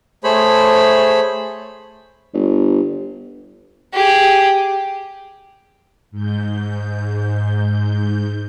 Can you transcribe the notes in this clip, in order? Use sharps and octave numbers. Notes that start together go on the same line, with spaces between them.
A3 G#4 C5 C#5 B5
G1
G4 G#4
G#2 G6